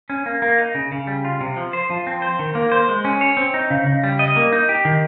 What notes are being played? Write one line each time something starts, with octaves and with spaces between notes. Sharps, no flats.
C#4
A#3
A#3
D#4
C#3
C#3
G3
F4
C3
F3
C5
F3
C4
C5
D#3
A#3
C5
G#3
C#4
C#5
C4
D#4
C#3
C#3
G3
D#5
A#3
D#4
G4
D#3